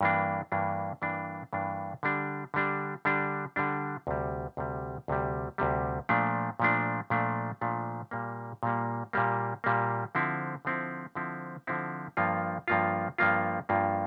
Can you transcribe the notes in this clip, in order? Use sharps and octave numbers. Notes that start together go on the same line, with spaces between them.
G2 E3 A#3 D4
G2 E3 A#3 D4
G2 E3 A#3 D4
G2 E3 A#3 D4
D3 G3 D4
D3 G3 D4
D3 G3 D4
D3 G3 D4
D2 C3 G3
D2 C3 G3
D2 C3 G3
D2 C3 G3
A#2 F3 A3 D4
A#2 F3 A3 D4
A#2 F3 A3 D4
A#2 F3 A3 D4
A#2 G3 A#3
A#2 G3 A#3
A#2 G3 A#3
A#2 G3 A#3
D3 F3 C4 E4
D3 F3 C4 E4
D3 F3 C4 E4
D3 F3 C4 E4
G2 F3 A#3 F4
G2 F3 A#3 F4
G2 F3 A#3 F4
G2 F3 A#3 F4